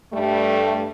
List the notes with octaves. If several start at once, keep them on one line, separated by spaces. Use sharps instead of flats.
G2 G3 A3